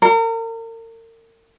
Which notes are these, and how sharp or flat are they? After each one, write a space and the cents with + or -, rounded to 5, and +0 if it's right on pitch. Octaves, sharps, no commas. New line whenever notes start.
A#4 -40